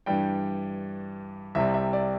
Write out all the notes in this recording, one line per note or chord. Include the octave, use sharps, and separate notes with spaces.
G2 E3 G3 G5
C2 C3 G3 E5
E5
D5